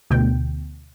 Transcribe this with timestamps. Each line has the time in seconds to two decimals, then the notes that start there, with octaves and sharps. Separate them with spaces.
0.10 D2 B2 G5